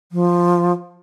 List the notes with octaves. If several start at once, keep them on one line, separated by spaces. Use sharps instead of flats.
F3